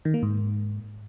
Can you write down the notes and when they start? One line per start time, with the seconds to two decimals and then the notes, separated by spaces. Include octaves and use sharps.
0.05 D#3
0.14 A#3
0.23 G#2